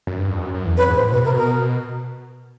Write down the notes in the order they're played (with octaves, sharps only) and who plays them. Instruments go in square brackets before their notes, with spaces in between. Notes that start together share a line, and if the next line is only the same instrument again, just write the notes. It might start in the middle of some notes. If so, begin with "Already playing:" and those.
[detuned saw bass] F#2
G2
F2
F#2
F#2
E2
[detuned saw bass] F2 [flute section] B4 C#5
[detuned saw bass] G#2
[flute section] C5
[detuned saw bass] A2
[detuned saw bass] B2 [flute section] B4
[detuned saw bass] C3 [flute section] A#4
[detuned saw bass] B2 [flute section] A#4